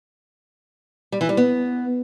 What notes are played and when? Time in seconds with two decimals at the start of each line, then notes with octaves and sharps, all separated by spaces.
1.12 G3
1.21 E3
1.29 G3
1.37 B3